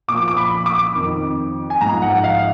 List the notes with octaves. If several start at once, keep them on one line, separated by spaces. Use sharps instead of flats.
A#2 D6
F3
D6
B5
D6
F2 D#3
G#5
G#2 F3 A#5
F#5
F5